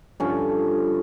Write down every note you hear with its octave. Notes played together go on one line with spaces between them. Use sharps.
G2 D3 F3 C#4